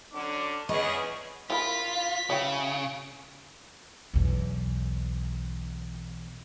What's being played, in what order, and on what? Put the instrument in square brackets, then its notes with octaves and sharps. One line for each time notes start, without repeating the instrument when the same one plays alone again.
[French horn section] D3 F#3 D4 [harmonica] C#4 D6
[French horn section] E2 G#4 [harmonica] C#4 B4 C#6 [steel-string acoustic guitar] D#5
[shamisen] E4 A#4 B5 [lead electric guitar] F4 [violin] B6
[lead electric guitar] C#3 [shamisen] F#3 E4 G5
[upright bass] B1 E2